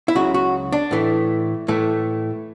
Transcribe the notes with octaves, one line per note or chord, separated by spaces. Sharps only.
E4
C#2 C#3 F#3 F#4
F#4
D4
A2 E3 A3
A2 E3 A3